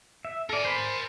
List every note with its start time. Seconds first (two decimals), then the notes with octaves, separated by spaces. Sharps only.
0.25 E5
0.49 A4 A#4 D5 G#5
0.65 C5 B5